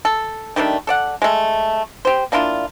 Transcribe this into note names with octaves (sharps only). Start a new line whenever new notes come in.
A4
D#3 G3 A3 D4
A4 D5 F#5
G#3 A3
G4 C5
A#3 D4 E4 F4